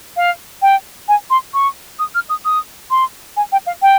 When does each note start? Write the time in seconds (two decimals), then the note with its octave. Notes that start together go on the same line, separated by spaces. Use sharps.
0.17 F5
0.62 G5
1.08 G#5
1.30 C6
1.54 C#6
1.99 D#6
2.15 F6
2.29 D#6
2.45 D#6
2.90 C6
3.36 G#5
3.52 G5
3.66 F5
3.82 G5